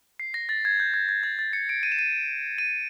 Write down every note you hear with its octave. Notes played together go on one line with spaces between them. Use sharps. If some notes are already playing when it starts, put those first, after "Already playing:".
C7
A#6
A6
G#6
G6
G#6
G#6
A6
A6
C#7
D7
D#7
E7
D#7
D#7